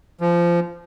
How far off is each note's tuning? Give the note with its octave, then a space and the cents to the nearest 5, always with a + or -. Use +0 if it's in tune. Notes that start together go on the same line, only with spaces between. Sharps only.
F3 -20